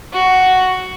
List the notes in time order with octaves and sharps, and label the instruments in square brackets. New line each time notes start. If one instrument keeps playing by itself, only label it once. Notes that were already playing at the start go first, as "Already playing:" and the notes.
[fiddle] F#4